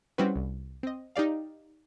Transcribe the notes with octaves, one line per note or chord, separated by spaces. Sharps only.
G3 C4 C#4 E4 F#4 B4
C2
C4 D#5
D#4 G4 D5 F5